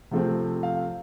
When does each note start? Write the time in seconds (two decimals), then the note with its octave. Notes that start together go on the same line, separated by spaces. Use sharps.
0.11 C3 F3 A3 C4
0.63 F5